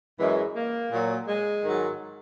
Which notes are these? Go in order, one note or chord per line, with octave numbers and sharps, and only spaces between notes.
F#2 E3 G#3
A#3
A#2 F#3
G#3
G#2 D#3 F#3